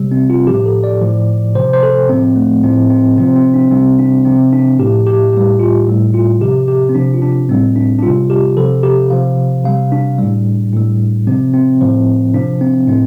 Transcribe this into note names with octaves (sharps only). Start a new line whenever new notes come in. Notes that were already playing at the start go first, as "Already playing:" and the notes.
Already playing: C3 G3
C4
F4
A2 F3 G4
A4
D5
A2 F3
C3 F3 C5
C5
A4
A2 F3 C4
A3
A2 F3 C4
C4
C3 F3 C4
C4
D4
C3 G3 C4
D4
C3 F3 C4
D4
A2 F3 G4
G4
A2 G3 G4
F4
A2 G3
F4
C3 F3 G4
G4
C4
C3 F3 D4
F4
D4
A2 G3 C4
D4
D4
C3 G3 F4
G4
C3 F3 A4
G4
C3 F3 F5
C3 G3 F5
D4
A2 G3
A2 G3
C3 F3 C4
C4
A2 F3
C3 F3 D4
C4
A2 C4